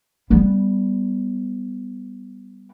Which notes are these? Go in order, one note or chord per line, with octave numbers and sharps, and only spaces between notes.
G3 B3